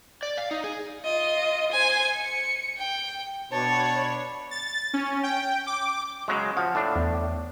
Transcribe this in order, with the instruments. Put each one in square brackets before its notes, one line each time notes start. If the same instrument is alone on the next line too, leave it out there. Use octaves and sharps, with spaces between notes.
[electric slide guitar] D5
F5
D#4
G#4
[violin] F4 D#5
C5 G#5
C#7
G5
[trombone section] B2 [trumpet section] D4 B5 [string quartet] C#5 [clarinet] A5
[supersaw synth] A6
C#4
G5
D6
[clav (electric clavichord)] C#3 F#3 G#3
[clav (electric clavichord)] F3 [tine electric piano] F#5
[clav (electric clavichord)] A2 D4 [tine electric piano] A5
[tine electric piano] E2